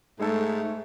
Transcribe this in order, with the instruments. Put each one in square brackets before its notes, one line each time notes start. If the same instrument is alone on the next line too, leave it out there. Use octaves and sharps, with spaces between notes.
[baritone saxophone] G#2 [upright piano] G#3 A4 [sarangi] A3